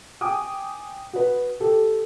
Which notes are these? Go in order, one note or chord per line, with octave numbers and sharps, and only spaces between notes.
G5 G#5 D6 D#6
F#4 B4
G4 A4